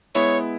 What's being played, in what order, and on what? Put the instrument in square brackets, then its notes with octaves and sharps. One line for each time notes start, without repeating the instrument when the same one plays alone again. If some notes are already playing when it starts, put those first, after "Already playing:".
[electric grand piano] G#3 B3 E4 [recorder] C#5